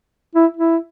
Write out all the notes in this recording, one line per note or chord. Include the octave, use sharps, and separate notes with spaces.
E4
E4